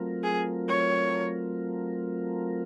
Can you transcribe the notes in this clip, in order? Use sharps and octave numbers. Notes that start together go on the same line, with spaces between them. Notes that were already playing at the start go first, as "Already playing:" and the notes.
Already playing: F#3 A3 C4 F4 A#4
G#4
C#5